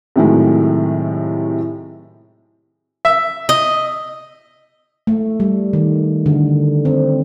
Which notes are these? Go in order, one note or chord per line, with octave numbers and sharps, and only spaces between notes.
A2 C3 D#3 F#3 G#3 A3
E5
D#5
A3
G3
D#3
D3
C4